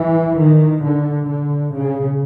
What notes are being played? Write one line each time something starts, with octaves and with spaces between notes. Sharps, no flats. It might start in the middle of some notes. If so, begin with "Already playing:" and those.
Already playing: E3
D#3
D3
D3
C#3